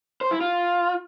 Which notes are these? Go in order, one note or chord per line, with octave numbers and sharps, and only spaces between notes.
C5
E4
F4